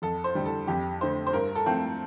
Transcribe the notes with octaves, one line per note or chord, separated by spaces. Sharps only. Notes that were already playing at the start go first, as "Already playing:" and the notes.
F2 A4
C5
D3 G3
A4
F2 G4
D3 A3 C5
C5
G2 A#4
A4
F3 A3 C4